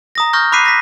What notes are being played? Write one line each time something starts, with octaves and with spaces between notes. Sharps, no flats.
A#5 D#6 A#6
C#6 F6 G6 A#6
B5 D6 F#6 B6 C7 D#7
A#6 B6